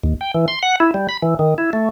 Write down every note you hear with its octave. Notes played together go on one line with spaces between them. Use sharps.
D#2
G5
E3
C6
F#5
E4
G3
B5
E3
D#3
E4
A3